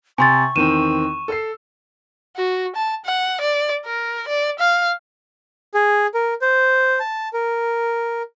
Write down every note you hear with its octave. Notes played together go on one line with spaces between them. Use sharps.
C3 G#5 C6 C#6 A6
E2 D#3 C4 D#7 E7
A4 E6 C7
F#4
A5
F#5
D5
A#4
D5
F5
G#4
A#4
C5
A5
A#4